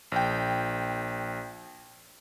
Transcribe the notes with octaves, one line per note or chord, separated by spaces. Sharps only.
A#1 G5